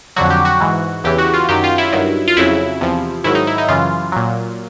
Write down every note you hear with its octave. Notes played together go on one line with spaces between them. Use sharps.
F2 D3 F#3 F#4
G4
F#4
G#2 E3
E2 C#3 E3 G4
F#4
F4
F#2 D#3 F#3 G4
F4
E4
G2 D#3 F#3
F4
F2 C#3 F#3 E4
E2 C3 F3
G#2 D#3 F#3 E4
D#4
E4
D#4
F#2 C#3 E3 F4
A#2 F#3